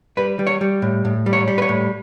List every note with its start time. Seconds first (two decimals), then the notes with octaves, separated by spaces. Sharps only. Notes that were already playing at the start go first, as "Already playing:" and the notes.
0.17 G3 B4
0.39 G3
0.47 C#5
0.61 G3
0.82 A2
1.05 A2
1.26 G3
1.33 C#5
1.48 G3
1.58 B4
1.62 C#5
1.69 A2